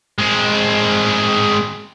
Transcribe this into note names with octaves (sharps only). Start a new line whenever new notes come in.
G#3 C4